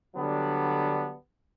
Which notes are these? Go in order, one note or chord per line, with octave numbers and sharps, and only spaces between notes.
D3 F#3 G3 B3 D4